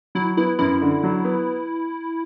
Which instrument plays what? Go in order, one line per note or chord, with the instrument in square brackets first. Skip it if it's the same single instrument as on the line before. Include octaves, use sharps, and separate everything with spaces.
[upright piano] F#3 [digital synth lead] E4
[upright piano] B3 [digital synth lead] E4
[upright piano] F#2 [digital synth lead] E4
[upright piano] D3
F#3
B3